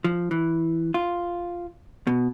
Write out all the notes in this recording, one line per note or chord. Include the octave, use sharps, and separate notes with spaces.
F3
E3
F4
B2